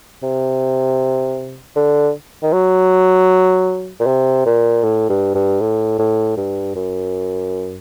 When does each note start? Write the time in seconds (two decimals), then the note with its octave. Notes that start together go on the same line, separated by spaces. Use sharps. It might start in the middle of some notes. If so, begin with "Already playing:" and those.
0.22 C3
1.76 D3
2.42 D#3
2.53 F#3
4.00 A#2
4.06 C3
4.45 A#2
4.83 A2
5.09 G2
5.34 G2
5.60 A2
5.98 A2
6.37 G2
6.75 F#2